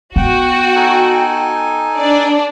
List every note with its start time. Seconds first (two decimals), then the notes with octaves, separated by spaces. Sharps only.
0.16 B3 F#4 F#5 G5
0.76 D#4 A4 G#5
1.96 D4 D5